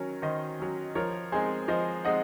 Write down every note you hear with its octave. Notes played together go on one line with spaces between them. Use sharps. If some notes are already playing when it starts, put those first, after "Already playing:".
Already playing: D#3 F#3 C#4 A#4
D#3 C5 D#5
F#3 C#4
F3 A#4 C#5
G#3 C4 D#4 G#4 C5
F3 C5 D#5
G#3 C4 D#4 D#5 F#5